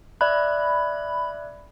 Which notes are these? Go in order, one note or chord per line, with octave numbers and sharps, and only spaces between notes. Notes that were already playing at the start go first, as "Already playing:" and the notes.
D5 E5 B5 F#6